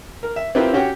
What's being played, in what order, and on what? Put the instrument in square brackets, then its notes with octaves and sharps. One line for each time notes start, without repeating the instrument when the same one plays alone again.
[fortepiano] A#4
E5
C4 E4 F4 G4 A#4 B4
C#4 F#4 G4 C#5 F#5 G5